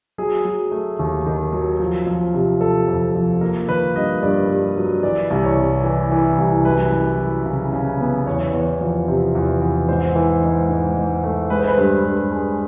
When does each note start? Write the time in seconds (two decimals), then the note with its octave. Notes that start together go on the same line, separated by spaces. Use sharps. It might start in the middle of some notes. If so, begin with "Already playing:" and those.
0.18 F#3 G#4
0.45 F#3
0.71 A3
0.99 D#2
1.26 D#3
1.53 F#3
1.80 F3
2.07 F3
2.34 C3
2.61 F3 A4
2.88 F2
3.15 F3
3.41 A#3 A#4
3.68 D#3 B4
3.95 G2 D#5
4.22 G2 D5
4.49 G2
4.76 F#3
5.03 E3 D5
5.30 C2
5.44 C#5
5.57 C3
5.84 E3
6.11 E3
6.38 C2
6.65 F#2 B4
6.92 F#2
7.19 F#3
7.46 C#3
7.73 C#3
8.00 B3
8.27 E2 C#5
8.53 E2
8.81 F3
9.08 C3
9.35 E2
9.62 E2
9.89 G#2 C5
10.15 E3
10.42 G#2
10.69 G#2
10.96 G#2
11.24 A3
11.50 G#3 B4
11.59 C5
11.68 B4
11.78 G2
12.05 G2
12.32 G#3